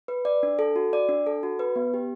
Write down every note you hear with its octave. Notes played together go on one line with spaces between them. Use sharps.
B4
D5
D4
A4
F#4
D5
D4
A4
F#4
B4
B3
G4